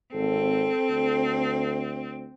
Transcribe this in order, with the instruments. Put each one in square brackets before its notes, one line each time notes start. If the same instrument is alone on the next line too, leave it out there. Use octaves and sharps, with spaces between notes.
[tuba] G#1 [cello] C4 [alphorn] A4
[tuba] D2